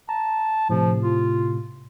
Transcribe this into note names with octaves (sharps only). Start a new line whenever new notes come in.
A5 A#5
A2 C3 F3
F4